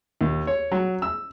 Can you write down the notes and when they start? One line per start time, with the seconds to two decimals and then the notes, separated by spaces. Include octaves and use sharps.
0.21 D#2
0.47 C#5
0.72 F#3
1.02 E6